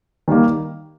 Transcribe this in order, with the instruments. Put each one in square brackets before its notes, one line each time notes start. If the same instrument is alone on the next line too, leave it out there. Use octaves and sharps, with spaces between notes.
[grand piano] D#3 G3 A#3